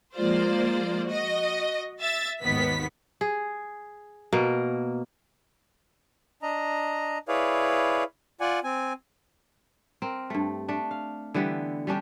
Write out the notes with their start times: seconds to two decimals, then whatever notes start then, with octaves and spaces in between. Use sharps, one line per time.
0.15 F3 G#3 A#3 F4 C5 D5
1.07 F#4 D#5
2.01 E5 A6
2.42 G#1 D#2 D#3 B3 B6
3.21 G#4
4.32 B2 A#3
6.42 D4 D#5 A#5
7.28 E4 G#4 B4 C#5 D5 F5
8.40 F4 D5 F#5 G#5
8.64 C4 G#5
10.02 C4 A#4
10.30 G2 A3
10.69 A3 D4
10.91 F5
11.34 D3 E3 G3 B3
11.87 G3 C#4 D4 G4